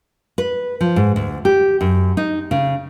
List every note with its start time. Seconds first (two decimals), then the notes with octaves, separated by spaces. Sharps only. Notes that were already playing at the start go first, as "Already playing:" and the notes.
0.38 B4
0.81 F3
0.96 G#2
1.16 D2
1.45 G4
1.81 F#2
2.17 D#4
2.51 C#3